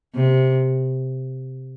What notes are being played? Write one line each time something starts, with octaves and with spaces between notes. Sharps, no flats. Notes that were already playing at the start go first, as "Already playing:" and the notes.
C3